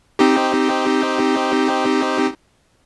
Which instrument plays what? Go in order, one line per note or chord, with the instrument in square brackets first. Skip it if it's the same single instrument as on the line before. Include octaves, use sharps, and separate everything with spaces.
[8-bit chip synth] C4 D#4 G4